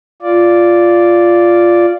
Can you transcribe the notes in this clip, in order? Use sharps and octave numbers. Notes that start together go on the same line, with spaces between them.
F4 D5